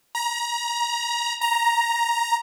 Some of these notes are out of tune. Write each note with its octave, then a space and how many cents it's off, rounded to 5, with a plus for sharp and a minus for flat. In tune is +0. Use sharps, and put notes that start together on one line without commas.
A#5 +30
A#5 +10